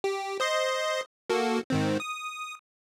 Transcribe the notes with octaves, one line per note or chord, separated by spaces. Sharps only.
G4
C5 D#5 C6
A#3 F#4 A4
G#2 D#3 C4
D#6